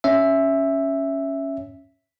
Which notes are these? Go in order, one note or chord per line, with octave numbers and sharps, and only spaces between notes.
C#4 E5